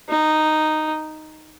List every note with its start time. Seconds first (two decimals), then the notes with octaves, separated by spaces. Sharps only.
0.09 D#4